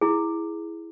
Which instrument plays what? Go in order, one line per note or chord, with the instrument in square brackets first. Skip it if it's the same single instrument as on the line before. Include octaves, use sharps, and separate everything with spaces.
[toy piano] E4 G#4